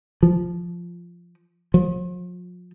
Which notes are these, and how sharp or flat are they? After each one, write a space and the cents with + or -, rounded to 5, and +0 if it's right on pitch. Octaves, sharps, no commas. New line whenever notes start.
F3 -5
F3 +40